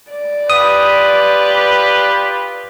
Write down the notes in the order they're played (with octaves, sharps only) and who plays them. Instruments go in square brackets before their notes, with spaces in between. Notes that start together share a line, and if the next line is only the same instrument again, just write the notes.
[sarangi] D5
[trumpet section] F4 G4 B4 [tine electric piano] D#6